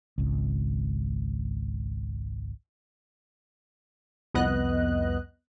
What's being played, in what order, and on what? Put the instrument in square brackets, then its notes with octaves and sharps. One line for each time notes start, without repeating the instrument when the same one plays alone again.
[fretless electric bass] G#1 C#2
[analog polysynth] C2 F2 B3 D#5 F#6